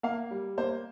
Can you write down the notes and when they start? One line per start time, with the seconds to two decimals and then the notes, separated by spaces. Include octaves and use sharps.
0.03 A#3 F5
0.31 G3
0.58 A#3 C5